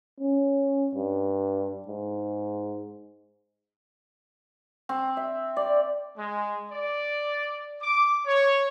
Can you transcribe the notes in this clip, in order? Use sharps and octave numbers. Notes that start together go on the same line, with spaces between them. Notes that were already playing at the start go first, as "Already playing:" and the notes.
C#4
G2
G#2
C4
E5
D5
G#3
D5
D6
C#5